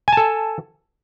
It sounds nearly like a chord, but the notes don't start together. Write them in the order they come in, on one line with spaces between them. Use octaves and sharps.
G#5 A5 A4